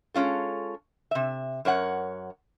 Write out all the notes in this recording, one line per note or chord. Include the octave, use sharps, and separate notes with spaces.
G#3 C#4 F4 A4
C3 E5
F#2 A#4 C#5 F#5